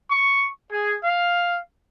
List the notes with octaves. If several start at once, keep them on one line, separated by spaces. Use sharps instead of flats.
C#6
G#4
F5